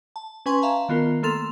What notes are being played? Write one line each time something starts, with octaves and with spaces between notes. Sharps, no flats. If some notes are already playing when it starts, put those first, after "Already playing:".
A5
C#4 B4 G#5 C6 C#6
E5 F5 A5 A#5
D#3 B3 F4 A#4
A3 A#3 A4 C6 A6 F7